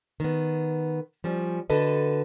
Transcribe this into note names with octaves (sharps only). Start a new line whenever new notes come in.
D#3 B3
F3 G3 C#4
D3 F#4 A4 B4 D#5